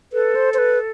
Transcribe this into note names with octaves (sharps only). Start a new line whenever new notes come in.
A4 B4
C5
C5
B4